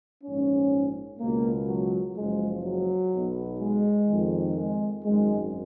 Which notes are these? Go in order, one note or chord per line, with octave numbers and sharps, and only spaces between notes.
A#1 G#2 F3 C#4
C#2 B2 A#3
F#3
F#1 F#2 F3 G#3
F#3
B1 B2
G#3
F2 D#3
G#3
G#1 F#2 D#3 G#3